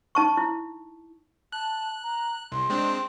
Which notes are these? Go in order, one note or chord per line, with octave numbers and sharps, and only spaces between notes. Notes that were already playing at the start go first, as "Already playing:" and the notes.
D#4 A5 C#6
E4
A5 F#6
A#5
C2 C6
G#3 C4 D4